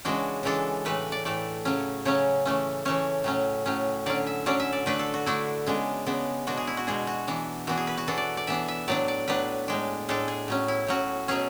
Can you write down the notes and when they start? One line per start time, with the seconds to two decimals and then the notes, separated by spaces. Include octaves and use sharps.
0.05 C#3 E3 G#3 D4 F#4
0.43 C#3 E3 G#3 D4 A4
0.85 A2 E3 A3 B4
1.12 D5
1.25 A2 E3 A3 D5
1.65 C#3 F#3 C#4
2.05 C#3 F#3 C#4 C#5
2.45 E3 A3 C#4
2.85 E3 A3 C#4 C#5
3.24 A2 F#3 C#4
3.66 A2 F#3 C#4
4.06 D3 F#3 C#4 D5
4.27 E5
4.46 D3 F#3 C#4 D5
4.60 E5
4.73 D5
4.86 D3 A3 D4 B4
4.99 A4
5.14 F#4
5.26 D3 A3 D4 E4
5.66 C#3 G#3 B3 D4
6.06 C#3 G#3 B3 D4
6.47 B2 G#3 D4 F#4
6.57 G#4
6.67 E4
6.77 F#4
6.87 B2 G#3 D4 G#4
7.07 F#4
7.27 E3 B3 D4
7.67 E3 B3 D4 F#4
7.77 G#4
7.87 B4
7.97 F#4
8.07 E3 B3 D4 A4
8.18 D5
8.37 D5
8.47 E3 B3 D4 E5
8.68 E5
8.88 A2 F#3 B3 D4 D5
9.08 D5
9.28 A2 F#3 B3 D4 B4
9.68 A2 G#3 D4
10.09 A2 G#3 D4 A4
10.28 G#4
10.48 A2 F#3 C#4
10.68 E4
10.87 A2 F#3 C#4 F#4
11.28 B2 F#3 C#4 G#4